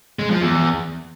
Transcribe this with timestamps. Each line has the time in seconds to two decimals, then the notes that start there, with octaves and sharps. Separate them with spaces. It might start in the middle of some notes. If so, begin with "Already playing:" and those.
0.19 G#3
0.30 F3
0.41 E2